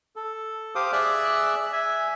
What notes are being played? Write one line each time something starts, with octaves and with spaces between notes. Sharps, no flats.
A4
G4 C5 F5 D6 D#6
G#4 D5 E5 E6 F#6
E5 G#5